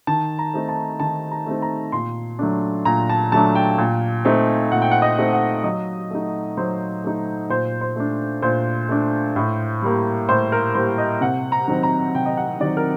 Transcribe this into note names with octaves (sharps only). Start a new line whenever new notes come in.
D#3 A5
A#5
A3 C4 D#4
A5
D#3 A5
A#5
A3 C4 D#4
A#5
A#2 C6
F#3 A3 D4
A#2 A#5
A5
F#3 A3 D4 A5
G5
A#2
A3 C4 D#4
A#2 F#5
G5
F#5
D#5
A3 C4 D#4
F#5
F#3 D#5
A3 D#4
F#3 C5
A3 D#4
A#2 C5
C5
A3 D4
A#2 C5
A3 D4
A2
G3 A#3
A2 C5
A#4
G3 A#3 C5
D#5
C3 F#5
A#5
D#3 F#3 C4 D#4
A#5
C3 G5
D#5
F#5
D#3 F#3 C4 D#4 D5
A#4